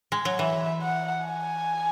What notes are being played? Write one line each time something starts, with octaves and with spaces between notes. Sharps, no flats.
G#3
F#3
E3 E5
F#5
G#5